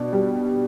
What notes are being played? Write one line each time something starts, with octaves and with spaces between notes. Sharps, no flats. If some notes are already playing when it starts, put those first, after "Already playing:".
Already playing: B2 D4
G3